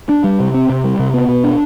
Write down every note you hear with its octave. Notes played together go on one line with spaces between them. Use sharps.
D4
G3
C3
C4
C3
G3
C3
B3
B2
D4